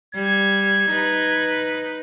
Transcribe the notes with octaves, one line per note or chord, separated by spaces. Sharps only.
G3 G#6
D#4 B4